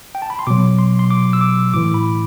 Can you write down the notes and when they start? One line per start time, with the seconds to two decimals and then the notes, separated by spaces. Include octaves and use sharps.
0.15 G5
0.22 A5
0.30 B5
0.39 C6
0.47 B2 F#3 D6
0.79 C6
0.99 C6
1.11 D6
1.33 E6
1.41 D6
1.73 A2 E3 D6
1.94 B5